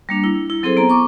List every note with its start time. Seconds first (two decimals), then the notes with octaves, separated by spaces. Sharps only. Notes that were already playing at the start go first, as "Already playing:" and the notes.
0.09 G3 A#3 D4
0.24 E4
0.50 E4
0.63 F#3 C4 E4 G#4 A4 C5
0.77 B3 A#5
0.90 C#6 D6